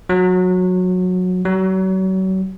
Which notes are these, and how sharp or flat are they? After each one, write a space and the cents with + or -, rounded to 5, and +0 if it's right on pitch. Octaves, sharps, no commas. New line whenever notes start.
F#3 -20
F#3 +35